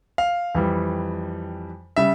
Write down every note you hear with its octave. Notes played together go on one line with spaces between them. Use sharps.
F5
F2 E3 G3
C#3 G3 E5